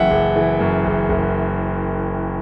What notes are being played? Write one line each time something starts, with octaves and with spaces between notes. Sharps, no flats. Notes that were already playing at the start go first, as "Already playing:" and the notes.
Already playing: F#1 F#2 E3 E5 F#5 G5
F#1
E3
F#2
F#1
F#1